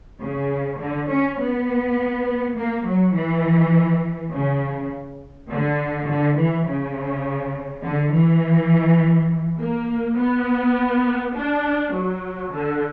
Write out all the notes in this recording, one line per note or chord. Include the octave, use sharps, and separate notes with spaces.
C#3
D3
C#4
B3
A#3
F#3
E3
C#3
D3
D3
E3
C#3
D3
E3
A#3
B3
D4
F#3
D3